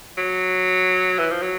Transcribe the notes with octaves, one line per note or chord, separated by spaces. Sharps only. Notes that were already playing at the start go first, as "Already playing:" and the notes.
F#3
E3
F3
F#3